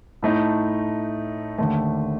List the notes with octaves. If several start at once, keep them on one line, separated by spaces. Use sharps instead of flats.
A2 A3 D#4
D#2 D3 A3